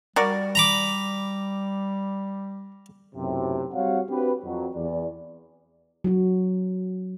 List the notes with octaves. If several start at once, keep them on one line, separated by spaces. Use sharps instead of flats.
G3 F#4 A#4 D5
A#5 B5 D6
B1 F#2 A2 C3
G3 C4 F#4 C#5 F5 F#5
C4 D4 F#4 G4 B4
F2 F#3
E2 D5
F#3 F#4